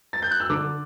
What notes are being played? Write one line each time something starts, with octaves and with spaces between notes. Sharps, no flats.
A6
G6
F#6
E6
D3 D6